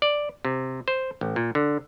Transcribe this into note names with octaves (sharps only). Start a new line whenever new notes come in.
D5
C3
C5
A1
A#2
D3